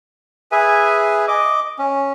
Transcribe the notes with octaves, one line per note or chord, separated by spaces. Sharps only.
G#4 B4 E5 G#5
D#5 D6
C#4